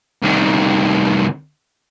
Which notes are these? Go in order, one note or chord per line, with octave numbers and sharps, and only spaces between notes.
C2 D#3